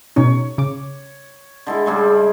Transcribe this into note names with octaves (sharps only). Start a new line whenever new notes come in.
B2 C#4 D#4 C#5
C#3 D6
D3 G#3 E4
C#3 G3 G#3